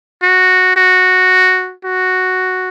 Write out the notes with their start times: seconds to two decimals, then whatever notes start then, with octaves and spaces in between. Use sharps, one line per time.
0.22 F#4
0.76 F#4
1.85 F#4